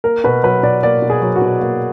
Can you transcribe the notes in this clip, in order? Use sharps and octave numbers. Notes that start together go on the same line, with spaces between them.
A#3 A#4
B2 B4
F#3 B4
B2 D5
A#3 D5
B2
G#4
F#3
F#4
B2
A#3